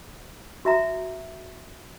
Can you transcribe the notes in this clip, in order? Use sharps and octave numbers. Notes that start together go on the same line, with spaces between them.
F#4 E5 A#5